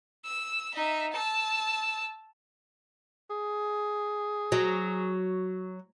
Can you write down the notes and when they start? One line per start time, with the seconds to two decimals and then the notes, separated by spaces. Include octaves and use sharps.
0.25 E6
0.74 D#4 E5
1.12 A5 E6
3.30 G#4
4.52 F#3